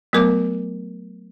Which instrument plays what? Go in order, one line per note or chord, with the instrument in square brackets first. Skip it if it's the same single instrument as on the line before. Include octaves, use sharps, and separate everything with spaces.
[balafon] F#3 A3 B3 A#4 D6